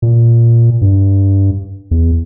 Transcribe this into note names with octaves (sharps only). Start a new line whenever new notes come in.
A#2
G2
E2